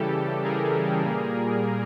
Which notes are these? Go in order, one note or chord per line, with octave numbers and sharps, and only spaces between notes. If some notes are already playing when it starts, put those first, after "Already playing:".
Already playing: C#3 E3 G3 G4 A4
G#4 A#4
A#2 G3 A#3